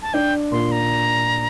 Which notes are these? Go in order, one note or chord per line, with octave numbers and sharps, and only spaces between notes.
A5
D4 G5
A#2 C6
A#5